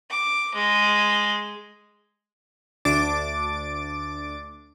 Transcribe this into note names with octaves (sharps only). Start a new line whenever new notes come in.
D6
G#3
D2 D4 D6 A6 D7